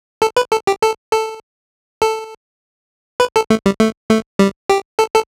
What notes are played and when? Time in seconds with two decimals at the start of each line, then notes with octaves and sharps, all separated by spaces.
0.22 A4
0.36 B4
0.52 A4
0.67 G4
0.82 A4
1.12 A4
2.02 A4
3.20 B4
3.36 A4
3.50 A3
3.66 G3
3.80 A3
4.10 A3
4.39 G3
4.70 G4
4.99 A4
5.15 A4